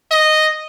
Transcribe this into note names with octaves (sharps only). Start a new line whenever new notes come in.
D#5